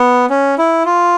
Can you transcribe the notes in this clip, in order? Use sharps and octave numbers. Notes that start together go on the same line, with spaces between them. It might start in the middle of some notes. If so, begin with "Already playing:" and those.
Already playing: B3
C#4
E4
F4